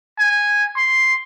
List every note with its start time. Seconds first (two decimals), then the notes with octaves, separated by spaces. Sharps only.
0.19 G#5
0.76 C6